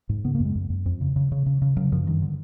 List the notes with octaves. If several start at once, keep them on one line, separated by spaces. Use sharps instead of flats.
G#2
C#3 B3
A#3
F#2
G#3
F#2
F#2
F2
C#3
C#3
C#3
C#3
C#3
C#3 F#3
F#2 F3
G2 D#3
D3